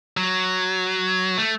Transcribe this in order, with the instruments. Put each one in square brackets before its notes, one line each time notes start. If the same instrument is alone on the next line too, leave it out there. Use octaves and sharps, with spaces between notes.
[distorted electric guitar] F#3
A3